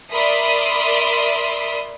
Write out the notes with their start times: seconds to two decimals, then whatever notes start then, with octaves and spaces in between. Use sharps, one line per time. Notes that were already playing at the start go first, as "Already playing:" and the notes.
0.11 A#4 D5 E5 B5 C6 D#6